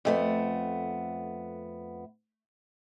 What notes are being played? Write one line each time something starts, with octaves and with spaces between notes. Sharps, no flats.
F2 A3 B3